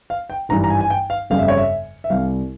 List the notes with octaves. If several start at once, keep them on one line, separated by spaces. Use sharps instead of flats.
F5
G5
G#1 G2 E3 G3 A#5
A#5
G#5
G#5
G5
F5
G1 F2 C#3 G3 F5
E5
C#5
E5
E5
C2 C3 G3 F5